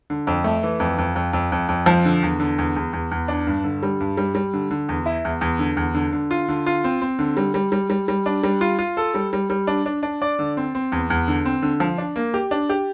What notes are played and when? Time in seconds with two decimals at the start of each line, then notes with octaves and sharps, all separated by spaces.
0.10 D3
0.27 F2
0.44 A3
0.63 E3
0.80 F2
0.98 F2
1.16 F2
1.33 F2
1.52 F2
1.69 F2
1.86 F3
2.05 D3
2.23 E2
2.40 D3
2.58 E2
2.76 E2
2.93 E2
3.11 E2
3.28 D4
3.47 G2
3.64 D3
3.83 G3
4.00 G2
4.17 G3
4.35 G3
4.53 D3
4.71 D3
4.89 E2
5.06 E4
5.25 E2
5.41 E2
5.59 D3
5.77 E2
5.94 D3
6.12 D3
6.31 F4
6.48 D3
6.66 F4
6.84 C4
7.01 C4
7.19 D3
7.37 G3
7.54 G3
7.72 G3
7.90 G3
8.08 G3
8.26 D4
8.43 G3
8.61 F4
8.79 F4
8.97 A4
9.14 G3
9.33 G3
9.50 G3
9.67 D4
9.86 D4
10.03 D4
10.22 D5
10.39 D3
10.57 C4
10.75 C4
10.92 E2
11.10 E2
11.28 D3
11.45 C4
11.62 D3
11.80 F3
11.98 D4
12.16 A#3
12.34 G4
12.51 D4
12.69 G4